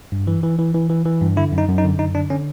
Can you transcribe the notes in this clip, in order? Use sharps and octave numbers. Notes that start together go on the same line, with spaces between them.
G2
E3
E3
E3
E3
E3
E3
G2
D3 E4
F#2
D#4
F#2
D#4
D3
F#2 D#4
D3 D4
D3 C#4